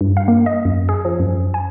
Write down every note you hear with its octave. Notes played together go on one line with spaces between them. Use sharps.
G2
F5
A#3
D#5
F#2
G#4
F3
F#2
G#5